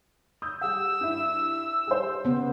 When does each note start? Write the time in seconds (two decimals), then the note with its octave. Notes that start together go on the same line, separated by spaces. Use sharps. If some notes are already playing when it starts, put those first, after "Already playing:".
0.42 D#6 E6 G6
0.61 G3 F#5 E6
1.01 G2 E4
1.87 G3 C5
2.25 C#3 B3